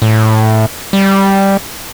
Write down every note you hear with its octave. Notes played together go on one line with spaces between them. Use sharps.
A2
G3